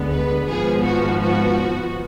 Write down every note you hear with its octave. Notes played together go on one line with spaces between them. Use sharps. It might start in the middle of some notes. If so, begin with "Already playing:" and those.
Already playing: D2 D3 G#3 B3
B4
G#1 G#2 F3 B3 G#4
F#4
F#4